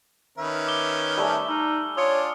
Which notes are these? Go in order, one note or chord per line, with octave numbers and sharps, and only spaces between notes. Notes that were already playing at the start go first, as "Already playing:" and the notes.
D#3 C#4 B4 E5
D6 G7
G3 A3 E5 G#5
D#4 E6 F6
D4 F4 C#5 D#6 C#7